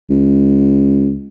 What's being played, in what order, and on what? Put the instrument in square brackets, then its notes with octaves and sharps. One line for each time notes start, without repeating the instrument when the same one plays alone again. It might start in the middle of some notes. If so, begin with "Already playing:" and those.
[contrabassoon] C#2